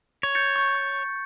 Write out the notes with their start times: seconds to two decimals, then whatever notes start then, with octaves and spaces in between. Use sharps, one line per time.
0.23 C#5
0.35 G6 A6 C#7
0.56 C#6 G6